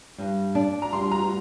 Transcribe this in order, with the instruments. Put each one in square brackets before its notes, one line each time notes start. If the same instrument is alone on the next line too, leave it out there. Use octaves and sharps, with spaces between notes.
[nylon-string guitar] G2
D4
[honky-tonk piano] A#5
[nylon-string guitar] G3 [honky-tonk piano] C6
[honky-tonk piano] A#5